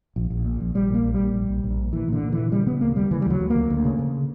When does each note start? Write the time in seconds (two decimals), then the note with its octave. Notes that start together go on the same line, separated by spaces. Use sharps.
0.16 A#1
0.30 A#1
0.45 A#2
0.60 A#1
0.75 A#1 G3
0.90 A#2 A#3
1.04 A#1
1.14 G3
1.20 A#1
1.34 A#1
1.49 A#1
1.64 A#1
1.78 A#2
1.93 A#2 E3
2.08 A#2 D3
2.23 A#2
2.32 E3
2.37 A#2
2.52 C#3 G3
2.67 C#3 B3
2.81 D2 A#3
2.96 C#3 G3
3.11 C#3 E3
3.21 G3
3.26 D2 F#3
3.40 D2
3.50 A#3
3.56 D2
3.70 D2
3.85 C#3
3.99 C#3